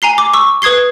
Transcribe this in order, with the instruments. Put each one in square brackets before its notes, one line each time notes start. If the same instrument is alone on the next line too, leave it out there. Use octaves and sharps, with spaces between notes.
[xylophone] G#5 A#5 C7 G7
D6
C#6 E6
B4 D#6 G#6 C7 G7